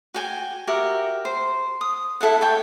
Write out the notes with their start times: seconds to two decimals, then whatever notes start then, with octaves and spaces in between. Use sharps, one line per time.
0.14 F#4 G5 G#5
0.67 F#4 G4 A#4 E5
1.25 C5
1.81 D#6
2.21 E4 A4 E5 F#5
2.41 A4 C#5 G5